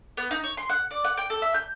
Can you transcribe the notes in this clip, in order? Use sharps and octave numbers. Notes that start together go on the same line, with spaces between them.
B3
D#4
C#5
C6
F#5
D5
F#5
G5
A4
E5
G6